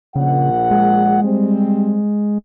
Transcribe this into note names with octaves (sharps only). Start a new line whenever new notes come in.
A#1 C#3 F#5
G#3
G3 C4